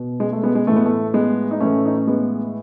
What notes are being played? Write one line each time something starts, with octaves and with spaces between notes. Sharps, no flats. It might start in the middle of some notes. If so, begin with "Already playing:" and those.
Already playing: B2
G#3
A3
G#3 B3
G#3
A2 E3 A3
B3
A3
G#3 B3
D#4
A2 E3 A3 C#4
D#4
C#4
G#3 B3